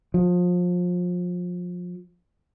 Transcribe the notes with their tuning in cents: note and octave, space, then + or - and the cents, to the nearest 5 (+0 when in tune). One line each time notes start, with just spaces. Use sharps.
F3 +30